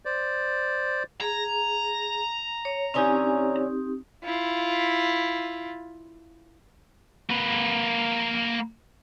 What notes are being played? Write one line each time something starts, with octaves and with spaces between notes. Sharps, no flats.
C5 D5
G#4 A#5
C#5
D3 E3 C4 C#4 D#4 G4
E4 F4
A#3 B4